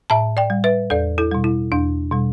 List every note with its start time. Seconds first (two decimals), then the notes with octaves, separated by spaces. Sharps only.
0.10 A2 E5 A5
0.37 D5 G5
0.50 G3
0.64 B4 E5
0.90 E2 A4 D5
1.18 E4 A4
1.31 B2 G3
1.44 E4
1.72 E2 D4
2.12 B2 G3